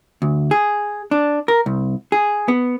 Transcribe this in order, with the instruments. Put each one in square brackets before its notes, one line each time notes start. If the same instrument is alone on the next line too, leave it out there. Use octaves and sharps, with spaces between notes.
[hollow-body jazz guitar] D2
G#4
D4
A#4
C2
G#4
B3